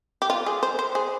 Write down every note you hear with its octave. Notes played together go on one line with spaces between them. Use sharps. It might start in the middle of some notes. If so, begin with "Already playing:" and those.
G4
F4
G#4
C5
C5
G#4